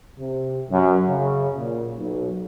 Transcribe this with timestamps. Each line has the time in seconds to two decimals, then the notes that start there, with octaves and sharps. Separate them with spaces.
0.18 C3
0.71 F#2
1.08 C#3
1.57 A#2
1.98 B1